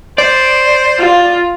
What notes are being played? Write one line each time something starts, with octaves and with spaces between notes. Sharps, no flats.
C5 D5
F4